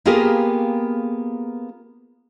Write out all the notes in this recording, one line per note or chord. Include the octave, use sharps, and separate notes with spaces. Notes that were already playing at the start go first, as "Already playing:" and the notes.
A#3 B3 F4 G4 G#4 A#4